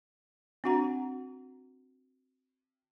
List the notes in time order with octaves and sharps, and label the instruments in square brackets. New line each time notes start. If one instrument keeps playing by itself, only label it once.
[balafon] C4 D4 F#4 F#5 A#5